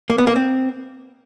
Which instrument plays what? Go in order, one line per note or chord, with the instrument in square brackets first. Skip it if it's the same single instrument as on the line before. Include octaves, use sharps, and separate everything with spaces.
[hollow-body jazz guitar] A#3
B3
A#3
C4